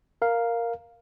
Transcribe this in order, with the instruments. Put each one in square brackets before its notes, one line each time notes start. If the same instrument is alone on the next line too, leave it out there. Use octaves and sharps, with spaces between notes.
[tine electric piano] A#4 F5